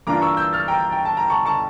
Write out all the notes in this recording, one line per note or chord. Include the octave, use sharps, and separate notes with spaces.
G2 E3 A#3 D4 F4 A#5 D6
C#6 E6
E6 G6
F6 A6
G5 A#5
G5
A5
A#5
A5 C#6
A5 C#6